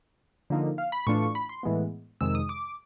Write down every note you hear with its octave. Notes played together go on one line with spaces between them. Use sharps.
D3 F3 A#3 D#4
F5
B5
A2 E3 A3 D4 F4 C#6
B5
C6
A2 E3 G#3 B3
F2 C3 D#3 G#3 E6
D#6
D6